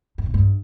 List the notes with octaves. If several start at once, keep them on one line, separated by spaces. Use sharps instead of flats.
G2
A#2
G2